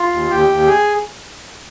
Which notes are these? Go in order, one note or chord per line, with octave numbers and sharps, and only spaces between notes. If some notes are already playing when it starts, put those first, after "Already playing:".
Already playing: F4
D#2
D#2 G4
D#2
G#4